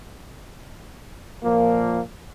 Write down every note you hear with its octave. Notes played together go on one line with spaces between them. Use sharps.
A#2 F3 A#3